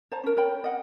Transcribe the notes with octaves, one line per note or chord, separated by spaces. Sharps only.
C5 A5 A#5
C#4 A#4
A#4 C#5 G5 B5
D#5 F#5